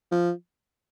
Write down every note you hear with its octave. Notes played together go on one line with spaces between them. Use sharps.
F3